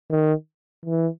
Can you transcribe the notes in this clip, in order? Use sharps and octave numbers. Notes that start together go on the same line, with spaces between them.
D#3
E3